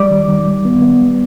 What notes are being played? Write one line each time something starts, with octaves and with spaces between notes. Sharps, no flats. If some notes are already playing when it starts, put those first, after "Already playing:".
Already playing: G3 D5 D6
D#3
D#3
G3
B3
B3
G3